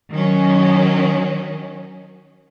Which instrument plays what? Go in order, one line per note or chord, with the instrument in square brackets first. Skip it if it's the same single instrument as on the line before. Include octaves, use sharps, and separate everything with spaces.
[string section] D#3 F#3 C#4